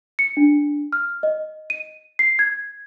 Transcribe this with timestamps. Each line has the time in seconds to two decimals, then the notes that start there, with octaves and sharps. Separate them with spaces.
0.19 C#7
0.37 D4
0.93 F6
1.23 D#5
1.70 D#7
2.19 C7
2.39 G#6